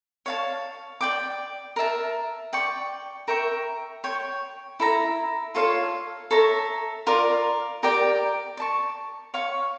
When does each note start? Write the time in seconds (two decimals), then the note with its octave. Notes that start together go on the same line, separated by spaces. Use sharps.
0.26 C#5 F5 A5
1.01 D5 G5 D6
1.76 A#4 E5 A5
2.53 D5 G5 C#6
3.28 A#4 E5 G5 C#6
4.04 C#5 G5 C#6
4.80 E4 A4 E5 A#5
5.55 F4 A4 C#5 F5
6.31 A4 C#5 E5 A#5
7.07 F4 A#4 D5
7.83 G4 A#4 D5 G5
8.57 D5 A5 C#6
9.34 C#5 F5 C#6